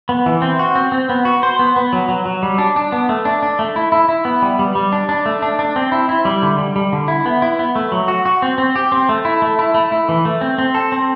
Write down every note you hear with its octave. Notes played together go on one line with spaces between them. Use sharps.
B3
E3
C4
F#4
C4
C4
B3
F#4
C5
B3
B3
F#3
F#3
F#3
G3
D4
D4
B3
A3
D4
D4
A3
E4
E4
E4
B3
G3
G3
G3
D4
D4
A3
D4
D4
C4
E4
E4
G3
D3
G3
G3
D3
E4
B3
E4
B3
A3
F#3
F#4
F#4
C4
C4
G4
C4
A3
E4
A3
E4
A3
E4
E3
A3
C4
C4
A4
C4